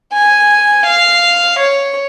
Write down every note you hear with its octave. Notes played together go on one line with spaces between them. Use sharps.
G#5
F5
C#5